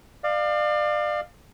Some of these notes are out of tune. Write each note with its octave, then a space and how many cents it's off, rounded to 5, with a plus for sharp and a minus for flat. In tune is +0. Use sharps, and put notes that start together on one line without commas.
D5 +35 F5 +0